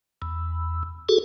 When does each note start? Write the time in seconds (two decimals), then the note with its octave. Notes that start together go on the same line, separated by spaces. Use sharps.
0.22 E2
1.09 F#4 G#4 A4